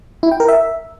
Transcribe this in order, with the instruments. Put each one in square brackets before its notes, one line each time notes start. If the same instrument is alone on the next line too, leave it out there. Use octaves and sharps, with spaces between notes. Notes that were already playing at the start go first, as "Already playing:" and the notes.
[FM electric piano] E4
G5
A#4
E5